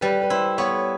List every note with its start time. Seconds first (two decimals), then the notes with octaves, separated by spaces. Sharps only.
0.01 G3 B4
0.22 B4
0.30 E4 C5
0.58 B3 C#5